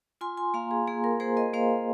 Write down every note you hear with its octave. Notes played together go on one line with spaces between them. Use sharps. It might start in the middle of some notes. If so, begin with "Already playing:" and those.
F4 G#5 C6
G#5 C6
A#3 F5 A#5
G#4
A#3 G#4
A#4
A#3 G#4 C5
A#4 D#5
A#3 C5 F5